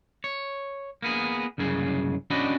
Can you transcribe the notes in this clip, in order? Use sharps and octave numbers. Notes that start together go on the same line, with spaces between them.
C#5
A#3 B3 G#4
C2 F#2 C#3 G#4
C#4 D4 F#4 G4 D#5 B5